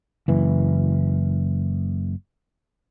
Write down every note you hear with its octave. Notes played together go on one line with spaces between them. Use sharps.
F#1 E3